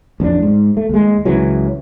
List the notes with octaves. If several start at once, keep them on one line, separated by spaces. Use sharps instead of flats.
A1 F2 A#3 D4
G#2
A3
D#2 G#3
C#2 C#3 E3 F#3